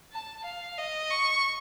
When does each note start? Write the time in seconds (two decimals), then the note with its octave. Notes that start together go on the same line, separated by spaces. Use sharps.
0.12 A5
0.45 F5
0.78 D#5
1.10 C#6